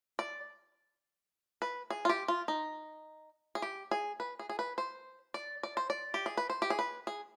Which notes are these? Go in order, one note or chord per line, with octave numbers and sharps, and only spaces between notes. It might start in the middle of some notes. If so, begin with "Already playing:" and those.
D5
B4
G#4
F4
G4
F4
D#4
G#4
G4
G#4
B4
G#4
G#4
B4
C5
D5
D5
C5
D5
G4
G#4
B4
C5
G4
G#4
B4
G#4